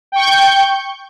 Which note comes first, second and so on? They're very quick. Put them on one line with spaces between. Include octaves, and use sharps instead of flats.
G5 C#6 G6